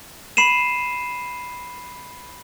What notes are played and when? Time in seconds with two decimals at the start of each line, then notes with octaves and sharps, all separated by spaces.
0.37 B5 C7 D#7 E7